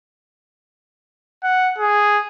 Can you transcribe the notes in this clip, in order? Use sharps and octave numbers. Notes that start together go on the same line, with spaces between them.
F#5
G#4